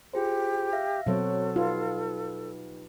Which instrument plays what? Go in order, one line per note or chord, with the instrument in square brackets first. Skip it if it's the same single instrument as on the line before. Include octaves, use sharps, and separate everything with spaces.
[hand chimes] F4 G#4 C5 [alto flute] G4
[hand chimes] E5 F5 A#6
[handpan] B2 F#3 [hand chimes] C4 C5 C#5 [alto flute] A4
[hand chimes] D#4 G4 B4 [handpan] F4